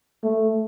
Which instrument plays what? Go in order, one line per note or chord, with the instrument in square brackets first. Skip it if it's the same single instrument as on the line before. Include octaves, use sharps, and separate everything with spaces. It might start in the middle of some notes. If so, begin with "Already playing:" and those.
[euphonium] A3